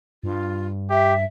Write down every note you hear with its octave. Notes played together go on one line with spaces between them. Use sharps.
G2 F4
G4 E5